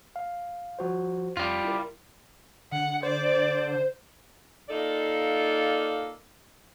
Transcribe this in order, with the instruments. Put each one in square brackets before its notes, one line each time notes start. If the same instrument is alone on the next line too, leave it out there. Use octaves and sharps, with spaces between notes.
[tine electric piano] F5
F3 F#4 C5
[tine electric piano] F2 [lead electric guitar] G3 F4
[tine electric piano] E4 A#4
[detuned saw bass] D3 [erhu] F#5
[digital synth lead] C5 [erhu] D5
[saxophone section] A#3 D#4 F4 A4 D5